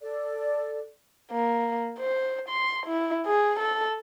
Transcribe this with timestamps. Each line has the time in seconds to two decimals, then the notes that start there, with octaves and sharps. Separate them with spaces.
0.01 A4 D5
1.32 A#3
1.99 C5
2.49 C6
2.86 E4
3.27 G#4
3.59 A4